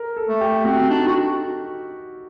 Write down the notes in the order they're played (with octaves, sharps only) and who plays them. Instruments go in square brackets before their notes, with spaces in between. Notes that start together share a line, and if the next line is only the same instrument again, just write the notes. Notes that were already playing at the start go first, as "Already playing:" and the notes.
Already playing: [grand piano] A#4
A4
[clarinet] A3
[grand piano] G4
[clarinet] C4 [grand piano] F#4
[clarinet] D4 [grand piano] D#4
[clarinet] F#4